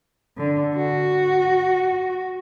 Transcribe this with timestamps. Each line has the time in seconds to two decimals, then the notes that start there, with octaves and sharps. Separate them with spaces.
0.37 D3
0.76 F#4